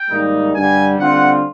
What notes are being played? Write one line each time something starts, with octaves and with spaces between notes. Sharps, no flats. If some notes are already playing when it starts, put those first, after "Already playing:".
Already playing: G5
G#2 D#3 G3 A#3 D#4
G2 D3 G3 G#5
D3 G3 C4 F4 F#5